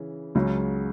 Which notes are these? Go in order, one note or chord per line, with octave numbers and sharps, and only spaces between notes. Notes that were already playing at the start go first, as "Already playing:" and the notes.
Already playing: C#3 E3
C#2 C#3 F#3